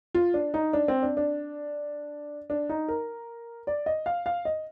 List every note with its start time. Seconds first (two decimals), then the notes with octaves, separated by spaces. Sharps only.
0.15 F4
0.34 D4
0.54 D#4
0.73 D4
0.88 C4
1.03 D4
1.17 D4
2.50 D4
2.69 D#4
2.88 A#4
3.67 D5
3.86 D#5
4.06 F5
4.26 F5
4.45 D#5